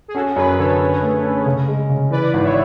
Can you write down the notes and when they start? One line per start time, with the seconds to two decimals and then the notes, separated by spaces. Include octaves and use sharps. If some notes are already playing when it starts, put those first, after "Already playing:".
0.08 G#4
0.15 C#4 F#4 A4
0.36 F#2 G#4 B4
0.58 D3 A4 C#5
0.80 C#4
1.02 A3
1.23 C#4
1.46 C#3
1.68 G#3
1.89 C#3
2.11 E3 B4 D5
2.34 G#1
2.43 C#5 E5